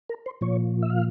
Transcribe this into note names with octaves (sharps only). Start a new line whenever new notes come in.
A#4
C5
A#2 F3 C#5
E5
F5